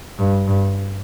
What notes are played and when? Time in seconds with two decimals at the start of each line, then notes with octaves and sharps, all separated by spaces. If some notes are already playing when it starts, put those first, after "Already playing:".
0.19 G2
0.47 G2